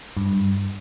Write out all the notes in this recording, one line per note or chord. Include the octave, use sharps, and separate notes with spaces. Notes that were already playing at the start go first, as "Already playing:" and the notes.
G2